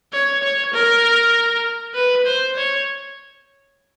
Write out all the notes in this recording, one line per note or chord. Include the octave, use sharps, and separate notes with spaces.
C#5
C#5
A#4
B4
C5
C#5